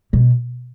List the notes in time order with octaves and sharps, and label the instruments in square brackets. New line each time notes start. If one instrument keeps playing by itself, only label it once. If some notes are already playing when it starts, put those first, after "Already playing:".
[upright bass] B2